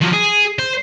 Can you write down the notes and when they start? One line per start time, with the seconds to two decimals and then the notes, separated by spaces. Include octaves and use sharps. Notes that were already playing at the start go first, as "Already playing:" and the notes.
0.01 F3 F#3
0.13 G#4
0.59 C5